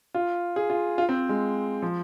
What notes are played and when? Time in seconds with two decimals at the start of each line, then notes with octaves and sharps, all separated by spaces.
0.14 F4
0.56 G#4
0.70 F4
0.98 F4
1.09 C4
1.29 G#3
1.82 F3